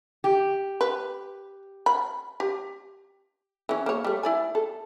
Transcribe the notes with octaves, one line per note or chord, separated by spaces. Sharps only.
G4
B4
B5
G4
E3 C#4
A#3 C#5
G3 A3
E4 D5 G#5
A4